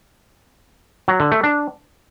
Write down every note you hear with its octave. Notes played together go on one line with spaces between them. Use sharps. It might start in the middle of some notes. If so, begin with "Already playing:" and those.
F#3
D3
A3
D4